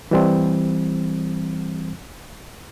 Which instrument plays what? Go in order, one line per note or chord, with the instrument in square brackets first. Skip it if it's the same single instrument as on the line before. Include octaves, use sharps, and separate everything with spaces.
[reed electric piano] E3 G3 C4